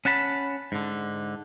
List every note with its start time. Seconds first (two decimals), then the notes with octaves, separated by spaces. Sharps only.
0.05 C#4 F#5 A5 B5
0.72 G#2 D3